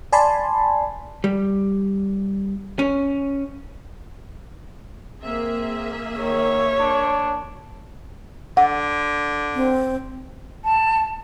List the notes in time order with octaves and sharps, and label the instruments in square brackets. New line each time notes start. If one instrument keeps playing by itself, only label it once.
[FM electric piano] D5 G#5 A5 B5 C6
[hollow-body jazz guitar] G3
C#4
[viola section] A#3 G#4 E5 [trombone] C4
[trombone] D#3 [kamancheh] C#5
[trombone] D4
[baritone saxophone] D3 [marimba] F#5
[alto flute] C4
[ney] A5